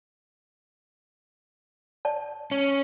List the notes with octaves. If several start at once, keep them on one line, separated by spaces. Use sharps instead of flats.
D5 A5
C#4